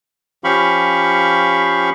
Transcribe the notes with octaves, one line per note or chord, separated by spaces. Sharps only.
F3 C#4 G4 F5 B5 C#6